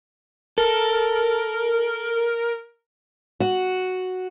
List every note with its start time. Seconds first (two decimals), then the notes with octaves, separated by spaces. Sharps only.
0.58 A4 A#4
3.40 F#4